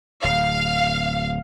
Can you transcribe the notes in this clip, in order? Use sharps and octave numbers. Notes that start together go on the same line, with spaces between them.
D1 F5